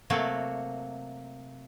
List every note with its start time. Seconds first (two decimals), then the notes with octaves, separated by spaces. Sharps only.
0.10 C3 F#3 A3 A#3 F#4